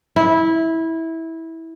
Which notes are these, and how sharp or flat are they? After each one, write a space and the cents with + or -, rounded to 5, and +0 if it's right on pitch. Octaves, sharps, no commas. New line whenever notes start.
E4 -15